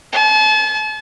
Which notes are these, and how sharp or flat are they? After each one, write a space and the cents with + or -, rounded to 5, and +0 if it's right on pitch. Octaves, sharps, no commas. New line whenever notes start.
A5 -40